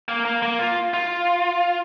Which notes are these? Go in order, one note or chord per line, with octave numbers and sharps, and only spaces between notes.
A#3
A#3
A#3
F4
F4